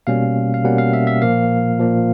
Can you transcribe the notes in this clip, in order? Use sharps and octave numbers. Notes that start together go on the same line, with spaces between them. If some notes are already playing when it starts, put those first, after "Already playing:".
B2 G3 A#3 C#4 F5
F5
B2 G3 A#3 C#4 F#5
F5
E5
E5
A#2 F3 A#3 F5
A#2 F3 A#3